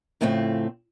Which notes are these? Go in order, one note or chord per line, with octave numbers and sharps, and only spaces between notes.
F2 A2 C#3 A3 C4